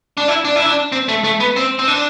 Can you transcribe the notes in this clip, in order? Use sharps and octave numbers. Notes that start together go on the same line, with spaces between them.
D4
E4
D4
E4
D4
C4
A3
A3
B3
C4
C4
D4